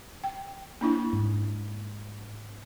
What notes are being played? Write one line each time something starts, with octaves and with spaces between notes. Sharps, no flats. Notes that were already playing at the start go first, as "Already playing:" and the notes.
G5
A#3 D4 E4
G#2